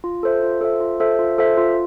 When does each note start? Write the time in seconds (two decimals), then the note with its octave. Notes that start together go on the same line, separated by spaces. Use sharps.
0.04 F4
0.23 A4 C5 E5
0.43 F4
0.61 A4 C5 E5
0.80 F4
1.00 A4 C5 E5
1.19 F4
1.38 A4 C5 E5
1.57 F4